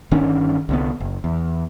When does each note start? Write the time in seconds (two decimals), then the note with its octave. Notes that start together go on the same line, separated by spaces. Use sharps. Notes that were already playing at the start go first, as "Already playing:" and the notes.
0.11 G1 D#3 C#4 D4
0.69 C2 D3 B3
1.00 F#1
1.24 E2